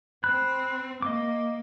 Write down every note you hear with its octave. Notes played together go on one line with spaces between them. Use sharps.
C4 B5 F#6
A#3 D#5 D6